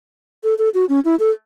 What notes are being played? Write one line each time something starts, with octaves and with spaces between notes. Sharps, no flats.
A4
A4
F#4
C#4
E4
A4